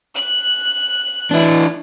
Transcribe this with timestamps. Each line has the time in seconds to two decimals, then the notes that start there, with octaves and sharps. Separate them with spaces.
0.14 F#6
1.31 E3 D4 E4